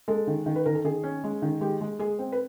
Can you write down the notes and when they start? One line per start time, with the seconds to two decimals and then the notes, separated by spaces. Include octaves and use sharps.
0.08 G#3 A4
0.27 D#3
0.46 D#3
0.56 B4
0.65 D#3 A#4
0.75 A4
0.85 D#3 G#4
1.03 C#4
1.24 G#3
1.42 D#3
1.61 G#3 G4
1.81 G#3
1.99 G#3 G#4
2.19 C4
2.32 B4